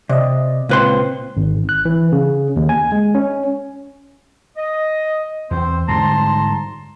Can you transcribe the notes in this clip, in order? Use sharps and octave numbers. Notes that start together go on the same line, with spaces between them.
C3 D5 D#5
C#2 A#2 C4 B4 C6
G#1
F#6
E3
C#3
D#2
G#5
G#3
C#4
D#5
E2 C4 C5
G#2 D3 G3 A5 A#5 C6